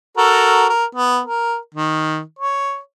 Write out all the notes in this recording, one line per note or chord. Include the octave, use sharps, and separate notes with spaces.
F#4 A4 A#4
A#4
B3
A#4
D#3
C#5